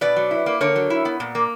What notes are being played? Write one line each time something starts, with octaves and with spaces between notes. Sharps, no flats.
B2 B4 D5
F#3
E4
A#3
D3 A#4 C#5
F#3
E4
B3
A#2
A#3